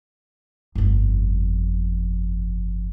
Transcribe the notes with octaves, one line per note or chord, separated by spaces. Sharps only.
G1 F2